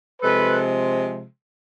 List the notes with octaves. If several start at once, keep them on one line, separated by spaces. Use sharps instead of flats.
C3 F3 G#3 A4 B4